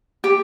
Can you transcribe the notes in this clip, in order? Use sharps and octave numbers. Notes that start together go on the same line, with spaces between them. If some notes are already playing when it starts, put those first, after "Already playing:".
G4